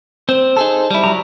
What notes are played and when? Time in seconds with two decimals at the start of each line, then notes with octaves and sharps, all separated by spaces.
0.29 C4 C5
0.57 D#4 G#4 A4
0.91 G3 E4
1.04 F#3 A#5